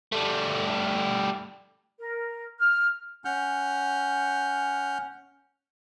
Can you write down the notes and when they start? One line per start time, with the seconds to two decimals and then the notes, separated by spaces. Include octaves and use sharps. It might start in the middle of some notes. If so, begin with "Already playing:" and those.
0.12 G3 A3
1.99 A#4
2.58 F6
3.25 C#4 F#5 F6 G6